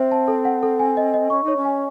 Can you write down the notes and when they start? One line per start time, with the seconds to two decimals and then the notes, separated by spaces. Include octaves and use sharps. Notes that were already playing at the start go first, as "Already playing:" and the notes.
Already playing: C4 C5 E5
0.12 A5
0.28 A4
0.45 F#5
0.63 A4
0.79 G#5
0.97 D#5
1.14 D#5
1.30 C#4 C#6
1.44 D#4 C#5
1.57 C#4
1.65 G#5